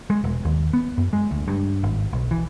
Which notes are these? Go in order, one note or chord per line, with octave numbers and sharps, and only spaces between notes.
G#3
E1
D#2
B3
F#2
G#3
D2
G2
G#1
B1
E3